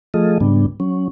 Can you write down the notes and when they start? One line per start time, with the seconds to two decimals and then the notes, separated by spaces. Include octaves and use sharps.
0.14 F3 A3 F4 G#4 A4 D#5
0.40 G#2 C#3 G3 B3 D4
0.80 F#3 C#4